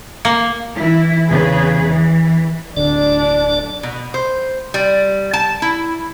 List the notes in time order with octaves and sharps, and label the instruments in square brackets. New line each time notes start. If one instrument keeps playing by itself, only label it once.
[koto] A#3
[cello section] E3 E4
E2 C#3 G#4 B4
E3
[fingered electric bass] D1 D3 [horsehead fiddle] D4 [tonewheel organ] D5
[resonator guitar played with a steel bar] B2
C5
G3
A5
E4